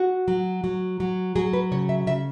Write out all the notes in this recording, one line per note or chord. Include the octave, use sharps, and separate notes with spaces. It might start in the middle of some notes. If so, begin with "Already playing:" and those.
Already playing: F#4
F#3
F#3
F#3
F#3 G#4
B4
C#3 C#5
E5
C#3 E5